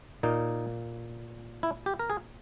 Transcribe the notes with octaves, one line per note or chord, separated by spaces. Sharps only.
A#2 A#3 D#4
E4
G4
A#4
G#4